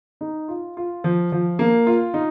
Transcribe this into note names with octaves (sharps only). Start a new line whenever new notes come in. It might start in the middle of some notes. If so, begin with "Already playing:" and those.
D#4
F4
F4
F3
F3
A#3
F4
D#4